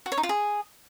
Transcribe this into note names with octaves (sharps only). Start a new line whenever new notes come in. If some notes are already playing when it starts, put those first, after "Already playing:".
F#4
C#5
D#4
F4
G#4